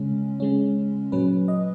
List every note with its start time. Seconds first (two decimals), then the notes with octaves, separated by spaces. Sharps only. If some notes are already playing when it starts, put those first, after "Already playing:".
Already playing: C#3 G#3 C#4
0.40 C#3 G#3 C#4
1.12 A#2 F#3 C#4 B4
1.48 D#5